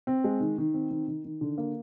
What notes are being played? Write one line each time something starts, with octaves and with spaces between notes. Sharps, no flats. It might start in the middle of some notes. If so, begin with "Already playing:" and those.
C4
G#3
D#3
D#3
C4
D#3
D#3
D#3
D3
A#3